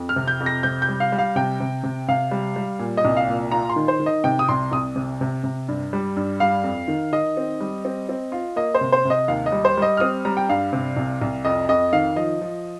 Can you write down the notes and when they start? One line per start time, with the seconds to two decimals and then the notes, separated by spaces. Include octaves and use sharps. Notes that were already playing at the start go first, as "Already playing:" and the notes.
Already playing: F2
0.09 F6
0.16 C3
0.28 G6
0.40 F2
0.46 A#6
0.63 C3 G6
0.82 G6
0.88 G3
1.00 F5
1.12 G3
1.18 F5
1.36 C3 G5
1.60 C3
1.83 C3
2.09 C3 F5
2.31 G3
2.56 G3
2.79 A#2
2.97 D#5
3.05 C2
3.17 F5
3.28 A#2
3.51 F4 A#5
3.70 C6
3.76 D#3
3.88 C5
4.00 D#3
4.06 D#5
4.24 C3 G5
4.39 D#6
4.49 C2 C6
4.72 C2 D#6
4.96 C3
5.21 C3
5.44 C3
5.68 G2
5.93 G3
6.17 G2
6.40 G3 F5
6.64 F2
6.88 D#3
7.13 D#3 D#5
7.37 C4
7.60 G3
7.85 C4
8.09 C4
8.32 F4
8.56 A#3 D#5
8.75 C5
8.81 C3
8.92 C5
9.05 C3 D#5
9.28 D#2 F5
9.46 D#5
9.52 G3
9.65 C5
9.77 G3 D#5
9.97 F6
10.00 C4 D#6
10.25 G3 A#5
10.37 G5
10.49 G2 F5
10.73 C3
10.97 C2
11.21 C2
11.45 F2 D#5
11.69 F2 D#5
11.93 D#3 F5
12.16 F3 D#5
12.41 F3